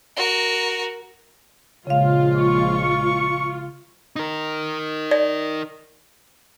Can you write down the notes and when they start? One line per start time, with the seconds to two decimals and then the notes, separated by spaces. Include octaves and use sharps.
0.17 F#4 A#4
1.87 A#1 C#3 F3 G#3 F4 F5
2.34 C#6
4.16 D#4 A#4
5.11 D5